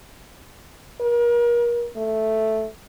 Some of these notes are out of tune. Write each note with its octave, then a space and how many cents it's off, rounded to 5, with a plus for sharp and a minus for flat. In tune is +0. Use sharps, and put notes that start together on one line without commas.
A#4 +35
A3 +0